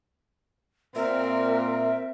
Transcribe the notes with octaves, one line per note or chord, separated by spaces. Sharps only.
A#2 C4 A#4 E5